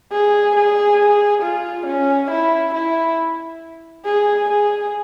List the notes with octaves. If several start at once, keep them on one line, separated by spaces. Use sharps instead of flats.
G#4
G#4
F4
C#4
E4
E4
G#4
G#4